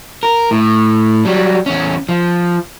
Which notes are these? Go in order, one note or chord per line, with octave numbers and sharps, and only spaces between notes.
A#4
A2
F#3 G3
E2 C#4
F3